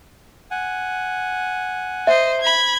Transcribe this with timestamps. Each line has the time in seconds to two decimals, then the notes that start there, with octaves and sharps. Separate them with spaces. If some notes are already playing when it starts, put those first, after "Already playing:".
0.51 F#5 G#5
2.07 C5 D#5 E5
2.41 B5 G#6